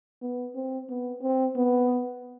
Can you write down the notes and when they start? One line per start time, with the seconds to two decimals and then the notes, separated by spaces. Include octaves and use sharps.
0.22 B3
0.55 C4
0.89 B3
1.23 C4
1.56 B3